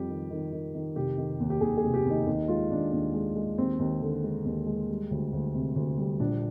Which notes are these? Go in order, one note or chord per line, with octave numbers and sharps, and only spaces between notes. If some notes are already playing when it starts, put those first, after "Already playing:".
Already playing: F2 G3 G4
D#3
D#3
D#3
D#3
F1 G4
D#3
D#2
G4
D#2 G#4
G#4
F1
G4
D#2
D#4
D#2 D#4
G#3 F4
D#2 D4
D#2 D4
G#3
G#3
D#2 C4
D#2
D3
G#3
D#2
G#3
G3
D2
D2
C3
D2
G3
A#1 D4